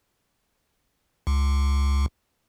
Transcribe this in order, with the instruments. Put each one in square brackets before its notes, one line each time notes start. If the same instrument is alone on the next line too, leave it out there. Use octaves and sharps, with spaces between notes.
[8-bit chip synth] C#2